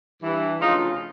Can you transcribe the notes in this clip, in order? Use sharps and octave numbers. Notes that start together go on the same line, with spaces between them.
G2 E3
D2 C#3 F3 D#4 F4